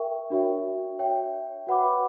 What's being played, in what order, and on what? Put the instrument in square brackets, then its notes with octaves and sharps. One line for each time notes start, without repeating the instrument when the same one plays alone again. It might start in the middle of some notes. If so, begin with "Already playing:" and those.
Already playing: [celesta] A#4 E5 G5 C#6
D4 F#4 C#5 E5 G5
C#5 E5 G5
F#4 B4 F#5 B5 D6